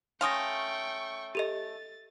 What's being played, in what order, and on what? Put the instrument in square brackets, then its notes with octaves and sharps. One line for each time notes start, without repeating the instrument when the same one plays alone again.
[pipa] A3 C#4 F5 [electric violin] G5 C#6 [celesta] C6 D#6 A#6
[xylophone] G4 A4 D#5 [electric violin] A6